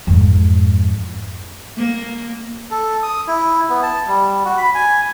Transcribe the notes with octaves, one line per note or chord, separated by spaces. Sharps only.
F2 G#2
A#3
A4
D#6
E4
B3
A5
G3
F#4
B5
G#5